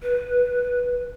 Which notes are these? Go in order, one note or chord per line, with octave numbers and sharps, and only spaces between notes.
B4